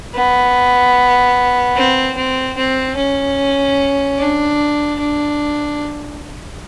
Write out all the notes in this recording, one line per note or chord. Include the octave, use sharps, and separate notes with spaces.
B3
C4
C4
C4
C#4
D4
D4